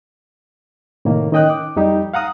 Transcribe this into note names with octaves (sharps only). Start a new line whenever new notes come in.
A2 C3 D#3 A#3
D#3 C#4 D#5 G5 D#6 F#6
D6
F2 G3 D#4 G4
F5 F#5 A#5 D#6